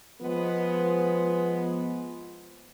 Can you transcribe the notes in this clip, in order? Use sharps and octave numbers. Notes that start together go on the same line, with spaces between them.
F3 G#3 B3